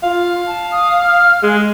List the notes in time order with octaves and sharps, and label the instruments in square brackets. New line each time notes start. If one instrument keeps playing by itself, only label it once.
[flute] F4 [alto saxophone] F5
[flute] A5
D#6
F6
[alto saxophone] G#3 [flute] G#4